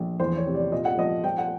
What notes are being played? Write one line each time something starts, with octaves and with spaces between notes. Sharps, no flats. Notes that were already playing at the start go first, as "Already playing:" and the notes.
Already playing: A#1
E2 C5
C#5
C3
D5
A#2 D#5
F#5
F3 D#5
F3 G5
F#5